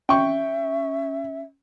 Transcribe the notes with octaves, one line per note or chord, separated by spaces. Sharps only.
C#4 E5 G5 C#6